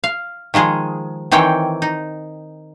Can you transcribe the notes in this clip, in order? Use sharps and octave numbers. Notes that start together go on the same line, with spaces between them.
F5
D#3 F3 G#3 G#4
D#3 E3 C4 C#5 G5
D#4